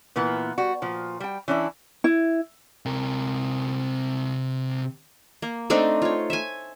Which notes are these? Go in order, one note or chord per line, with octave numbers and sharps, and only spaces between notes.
A#2 E3 A#3 B3
G3 F#4
A#2 F3
G3 G5
E3 C#4 D4 E4
E4
C3 A#4
A#3
A3 C4 D4 D#4
F4 C#5
E5 G#5